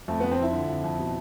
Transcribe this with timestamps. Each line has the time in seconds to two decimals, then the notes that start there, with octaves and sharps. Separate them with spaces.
0.08 F2 A3
0.20 F2 B3
0.31 C4
0.38 F3 E4
0.53 D3
0.69 F2
0.84 F2
0.99 B2